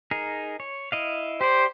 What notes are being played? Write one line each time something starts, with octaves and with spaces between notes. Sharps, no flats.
D#4 G#4 A#4
C#5
E4 D#5 F5
G4 C5 D5